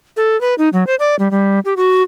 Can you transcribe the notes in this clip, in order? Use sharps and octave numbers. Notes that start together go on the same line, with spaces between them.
A4
B4
D#4
F#3
C5
D5
G3
G3
G4
F#4